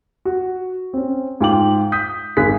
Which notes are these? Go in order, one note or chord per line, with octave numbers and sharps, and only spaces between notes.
F#4
C4 C#4
G#2 F4 G5 D6 F#7
D#6 G6 B6
G#1 G#4 F#6 B6